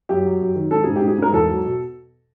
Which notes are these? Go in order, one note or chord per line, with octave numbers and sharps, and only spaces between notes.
F#2 G4
F#3
F#2
D#3
G#2 A4
G#2 G#4
G4
G#2
G#4
G#2 A#4
E2 A4
F#3
B2